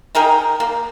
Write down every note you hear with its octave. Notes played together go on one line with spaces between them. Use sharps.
D#4 G#4 A#4 G5
A#3